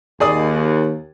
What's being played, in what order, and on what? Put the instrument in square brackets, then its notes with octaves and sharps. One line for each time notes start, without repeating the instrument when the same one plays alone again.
[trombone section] D#2 [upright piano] G#4 D5 D#6